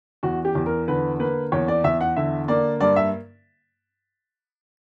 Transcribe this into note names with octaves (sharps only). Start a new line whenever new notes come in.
E2 F#4
G4
E2
A#4
D3 B4
A#3 B4
E2 C#5
D5
E2 E5
F#5
D3 E5
A#3 D5
G2 D5
E5